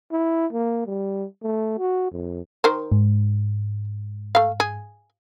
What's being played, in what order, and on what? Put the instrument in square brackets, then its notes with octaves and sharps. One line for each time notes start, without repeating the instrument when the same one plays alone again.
[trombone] E4
A#3
G3
A3
F#4
F2
[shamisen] D#3 A#4 C5
[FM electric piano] G#2
[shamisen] A3 F5
G#4